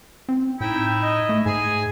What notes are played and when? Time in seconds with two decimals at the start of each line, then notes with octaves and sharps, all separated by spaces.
0.29 C4
0.61 A2 D#4 E4 G5
1.03 D#5
1.29 A3
1.46 G#2 G#4 G#5